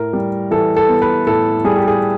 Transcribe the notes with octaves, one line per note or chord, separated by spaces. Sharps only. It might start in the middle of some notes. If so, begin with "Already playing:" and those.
Already playing: A2 A#4
G3
E3 A4
A4
B3
B4
A2 A4
G3 G#4
G4
G#4